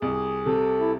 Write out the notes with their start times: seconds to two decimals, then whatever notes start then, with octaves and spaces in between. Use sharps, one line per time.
0.02 C2 G#4
0.46 C3 A4
0.80 E4